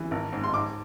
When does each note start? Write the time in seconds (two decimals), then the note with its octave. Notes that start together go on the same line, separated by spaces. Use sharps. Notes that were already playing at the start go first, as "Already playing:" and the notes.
Already playing: E3
0.11 G#1
0.33 G#2
0.44 C6
0.54 G#2 D6